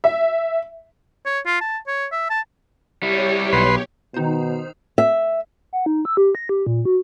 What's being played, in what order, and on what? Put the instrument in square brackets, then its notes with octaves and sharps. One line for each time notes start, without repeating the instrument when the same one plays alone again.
[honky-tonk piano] E5
[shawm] C#5
F4
A5
C#5
E5
A5
[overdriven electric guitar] G3 E4 [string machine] G4 C#5
[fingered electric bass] B1 [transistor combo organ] B4 C6
[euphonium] B2 [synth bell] D#3 D#4 C5
[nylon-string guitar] E5
[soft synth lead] F#5
D#4
E6
G4
A#6
G4
A#2
F#4